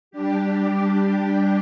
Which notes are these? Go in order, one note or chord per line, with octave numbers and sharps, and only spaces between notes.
G3 D4 G4